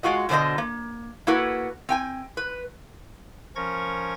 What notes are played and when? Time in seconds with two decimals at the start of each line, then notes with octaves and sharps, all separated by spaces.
0.03 G#3 F4 F#4 D#5
0.29 B2 D3 C4 C5 D#5
0.58 A#3
1.27 A#3 E4 F#4 A4 B4
1.89 C4 G5 G#5
2.37 B4
3.56 F3 C#4 A#4 C#6 G#6 A#6